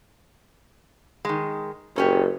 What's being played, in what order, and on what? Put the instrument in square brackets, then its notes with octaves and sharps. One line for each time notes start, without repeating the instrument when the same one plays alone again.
[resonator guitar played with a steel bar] D#3 G#3
[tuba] F#1 [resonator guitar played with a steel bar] A#2 C#4 G4